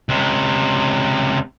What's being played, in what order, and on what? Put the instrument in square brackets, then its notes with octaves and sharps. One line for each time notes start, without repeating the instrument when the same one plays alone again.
[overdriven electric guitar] C#2 C3